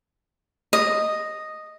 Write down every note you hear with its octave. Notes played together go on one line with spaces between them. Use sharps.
D#5